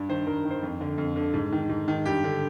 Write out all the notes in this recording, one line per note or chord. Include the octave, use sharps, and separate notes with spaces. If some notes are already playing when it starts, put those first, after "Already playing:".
Already playing: G2
D#3 C5
G2 A#4
D#3
C5
F2
D3
F2
D3
G#2
D#3
G#2
D#3
G2 G4
D3